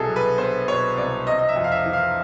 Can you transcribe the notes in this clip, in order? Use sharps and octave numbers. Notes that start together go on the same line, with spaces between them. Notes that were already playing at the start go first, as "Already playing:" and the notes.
Already playing: C2 B2 G#4 A4
F#3
B4
B3 C5
B2 C#5
C2 D5
C3 D#5
D#5
E5
F2
F5
E5
E3
F5